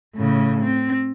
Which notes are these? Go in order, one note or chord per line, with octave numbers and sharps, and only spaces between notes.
A2 C#3
C4